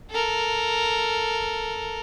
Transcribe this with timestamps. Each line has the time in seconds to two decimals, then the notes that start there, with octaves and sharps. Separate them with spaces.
0.10 A4 A#4